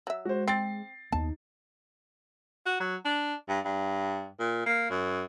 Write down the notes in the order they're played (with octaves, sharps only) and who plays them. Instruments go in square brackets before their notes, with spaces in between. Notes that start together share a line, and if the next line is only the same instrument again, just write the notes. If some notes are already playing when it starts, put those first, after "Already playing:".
[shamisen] F#3 E5
[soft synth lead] G#3 [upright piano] F#4 C5
[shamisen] C4 [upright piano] A6 C7
[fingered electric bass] D#2 B3 [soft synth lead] D#4 [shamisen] A5
[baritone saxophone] F#4
F#3
D4
G2
G2
A#2
A#3
F#2